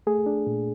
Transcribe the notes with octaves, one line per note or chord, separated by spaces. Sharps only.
A3 G#4
D4
A#2